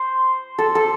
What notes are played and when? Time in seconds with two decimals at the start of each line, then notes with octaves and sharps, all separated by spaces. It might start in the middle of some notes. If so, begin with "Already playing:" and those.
Already playing: C5
0.58 A4
0.75 A4